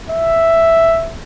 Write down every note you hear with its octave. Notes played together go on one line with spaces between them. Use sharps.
E5